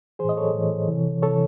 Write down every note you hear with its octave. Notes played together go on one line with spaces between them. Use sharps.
A2 E3 G#4 C5
D#5
A4 C#5
A2 E3
C3 E3
C3 E3 A4 C#5